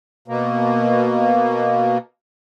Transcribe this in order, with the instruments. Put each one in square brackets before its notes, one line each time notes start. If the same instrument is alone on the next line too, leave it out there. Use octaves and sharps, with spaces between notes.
[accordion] B2 A#3